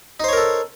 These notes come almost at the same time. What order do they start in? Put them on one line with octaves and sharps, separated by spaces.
D#4 C5 C#5 A#4 A4